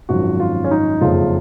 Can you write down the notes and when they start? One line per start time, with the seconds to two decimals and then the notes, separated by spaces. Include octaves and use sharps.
0.09 G#1 F#2 F3 F#4
0.40 F4
0.64 C#4
0.71 D#4
1.01 F#1 F2 C#3 F4